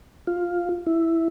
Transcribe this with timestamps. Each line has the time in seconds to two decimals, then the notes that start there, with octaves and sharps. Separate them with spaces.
0.27 F4
0.87 E4